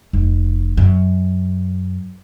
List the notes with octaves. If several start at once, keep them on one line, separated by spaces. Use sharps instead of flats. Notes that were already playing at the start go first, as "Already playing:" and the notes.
F1
F#2